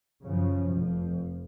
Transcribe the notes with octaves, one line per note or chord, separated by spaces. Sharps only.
F#2 C#3 F3
F1 F2 F3